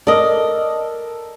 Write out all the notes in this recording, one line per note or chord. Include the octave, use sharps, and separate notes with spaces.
A4 A#4 D5 D#5